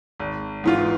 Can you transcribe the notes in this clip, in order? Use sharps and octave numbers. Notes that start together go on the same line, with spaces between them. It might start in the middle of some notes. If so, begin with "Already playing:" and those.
G#1
G#2 E3 B3 F4